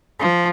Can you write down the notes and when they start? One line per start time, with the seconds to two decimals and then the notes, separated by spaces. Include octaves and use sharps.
0.19 F3